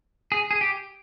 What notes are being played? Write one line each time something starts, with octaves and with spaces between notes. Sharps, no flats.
G#4
G#4
G4